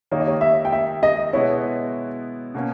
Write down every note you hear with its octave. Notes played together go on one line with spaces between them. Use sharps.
D#3 A#3 D#4 G4 C#5
D#5
C#5
E5
G5
E5
D#5
B2 G#3 B3 E4 C#5
B2 A#3 C#4